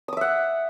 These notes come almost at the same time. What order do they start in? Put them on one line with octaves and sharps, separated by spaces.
D#6 D6 E5 F#5